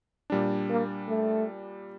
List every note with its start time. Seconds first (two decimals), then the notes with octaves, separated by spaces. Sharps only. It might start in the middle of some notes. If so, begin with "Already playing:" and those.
0.30 A#2 G3 D4
0.70 A#3
1.09 A3